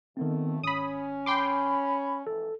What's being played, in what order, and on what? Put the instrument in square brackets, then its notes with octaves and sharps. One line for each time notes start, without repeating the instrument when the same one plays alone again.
[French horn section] F2 B2 A3 [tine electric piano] D#3 B3 C4
[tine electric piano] G#1 [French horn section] C#4 [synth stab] B5 D#6
[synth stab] G5 C6 D6 [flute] B5
[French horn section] F2 G#2 E3 [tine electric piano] A4